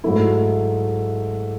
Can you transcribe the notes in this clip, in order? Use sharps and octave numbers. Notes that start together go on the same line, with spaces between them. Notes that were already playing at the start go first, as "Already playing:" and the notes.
G#2 F#3 A3 E4